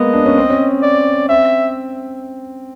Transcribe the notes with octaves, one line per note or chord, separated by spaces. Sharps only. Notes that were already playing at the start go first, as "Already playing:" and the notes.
Already playing: G#3 A#3 B3 D#5
D4
C#4
C4
C#4
D5
C4 E5